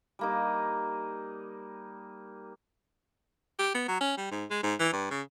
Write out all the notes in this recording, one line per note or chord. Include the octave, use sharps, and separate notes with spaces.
G3 A#3 D#4
G4
B3
F#3
C#4
G3
G#2
G#3
G#2
E3
G2
C#3